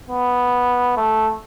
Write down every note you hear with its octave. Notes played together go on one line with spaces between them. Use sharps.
B3
A3